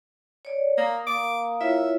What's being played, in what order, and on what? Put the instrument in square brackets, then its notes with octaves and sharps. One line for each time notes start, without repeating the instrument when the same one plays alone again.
[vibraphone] C#5 D5
[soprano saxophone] A#3 [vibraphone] D#6
[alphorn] A#3 [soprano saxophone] D6
[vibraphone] E4 F4 C#5 [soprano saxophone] E5